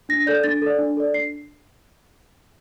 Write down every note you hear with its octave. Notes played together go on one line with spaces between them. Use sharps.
D4 A#6
A4 D5 G6
D4 A6
A4 D5
D4
A4 D5
D4 C7